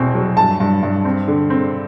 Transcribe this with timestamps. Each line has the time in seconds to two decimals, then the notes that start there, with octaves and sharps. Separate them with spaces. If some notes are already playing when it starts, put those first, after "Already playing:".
Already playing: E2 B2 C4
0.15 F#3
0.37 G2 A5
0.60 G2
0.83 G2
1.05 C4
1.28 D3
1.50 C4